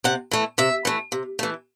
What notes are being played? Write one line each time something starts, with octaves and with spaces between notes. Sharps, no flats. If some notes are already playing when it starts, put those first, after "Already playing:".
C3 F#5
E3 A3
C3 E5
E3 A3
C3
E3 A3